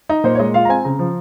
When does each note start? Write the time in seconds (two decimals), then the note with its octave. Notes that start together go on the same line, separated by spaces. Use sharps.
0.09 D#4
0.24 A#2 C5
0.35 C#5
0.39 G#3 D#5
0.54 F4 F5
0.65 A#5
0.69 C4 G#5
0.84 C#3 A#5
0.99 F3